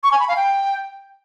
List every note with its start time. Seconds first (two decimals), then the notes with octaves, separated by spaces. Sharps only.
0.03 C#6
0.12 G#5
0.20 B5
0.28 F5
0.37 G5